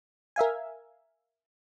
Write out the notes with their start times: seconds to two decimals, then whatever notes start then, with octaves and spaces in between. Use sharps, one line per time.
0.36 A#4 E5 F5 G#5